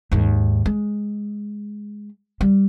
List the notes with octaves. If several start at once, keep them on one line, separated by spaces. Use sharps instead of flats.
D#2 G#2
G#3
G3